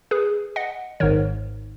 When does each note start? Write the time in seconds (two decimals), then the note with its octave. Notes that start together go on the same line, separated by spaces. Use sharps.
0.11 G#4 B4
0.56 D#5 F#5
1.00 G#1 G#2 D#3 A#4 C#5